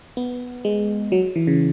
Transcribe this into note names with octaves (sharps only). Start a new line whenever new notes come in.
B3
G#3
F#3
E3
C#3